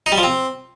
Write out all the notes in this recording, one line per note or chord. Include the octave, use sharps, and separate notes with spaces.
D#4
G3
F3
C4